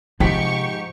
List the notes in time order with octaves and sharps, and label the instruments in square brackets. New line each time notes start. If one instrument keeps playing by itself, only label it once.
[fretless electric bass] G#2 [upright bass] C3 [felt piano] F3 G5 B6 [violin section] G4 C#6